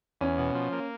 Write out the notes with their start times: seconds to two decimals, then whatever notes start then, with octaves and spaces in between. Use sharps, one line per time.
0.21 E2 C#4
0.38 B2
0.55 F3
0.72 A#3